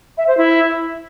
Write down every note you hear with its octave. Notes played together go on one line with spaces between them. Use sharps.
E5
C5
E4